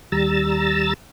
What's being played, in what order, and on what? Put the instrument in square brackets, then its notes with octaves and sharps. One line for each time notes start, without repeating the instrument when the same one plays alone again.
[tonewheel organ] D#2 G3 A#5 E6 A6